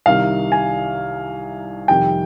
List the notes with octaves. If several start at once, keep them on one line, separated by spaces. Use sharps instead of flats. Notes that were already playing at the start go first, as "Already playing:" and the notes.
C2 C3 D#3 F5
G#5
F2 C3 D#3 G3 G5